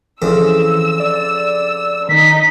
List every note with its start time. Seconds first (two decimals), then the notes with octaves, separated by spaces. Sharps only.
0.22 F2 C#3 E3 E6
1.00 D5
2.09 D#3 D#4 D#5 B6